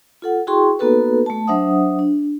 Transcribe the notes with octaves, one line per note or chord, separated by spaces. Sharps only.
F4 A4 F#5
E4 F#4 G#4 G5 C6 C#6
A#3 B3 D#4 F#4 A4 B4
A3 A5
F#3 D4 C5 E5 F#5 D#6
D4